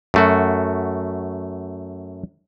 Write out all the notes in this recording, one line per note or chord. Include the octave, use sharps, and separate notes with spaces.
F#2 A3 F#4